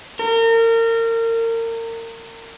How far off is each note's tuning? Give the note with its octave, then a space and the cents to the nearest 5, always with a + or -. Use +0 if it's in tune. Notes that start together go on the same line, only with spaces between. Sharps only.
A#4 -30